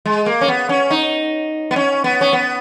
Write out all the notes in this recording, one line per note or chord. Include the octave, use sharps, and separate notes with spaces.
G#3
A#3
C#4
B3
C#4
D#4
B3
C#4
B3
C#4
B3